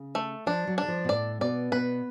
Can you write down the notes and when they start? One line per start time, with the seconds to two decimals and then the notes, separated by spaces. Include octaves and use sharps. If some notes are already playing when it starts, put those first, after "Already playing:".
Already playing: C#3
0.15 A3
0.46 F3 D4
0.67 F#3
0.78 D3 D4
0.88 F3
1.04 B2
1.09 A2 D5
1.41 B2 D5
1.72 B2 B4